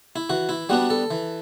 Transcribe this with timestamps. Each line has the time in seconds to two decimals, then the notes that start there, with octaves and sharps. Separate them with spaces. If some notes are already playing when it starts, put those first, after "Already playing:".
0.16 E4
0.30 E3 F#4
0.49 E4
0.69 G3 B3 D4 F#4
0.90 A4
1.11 E3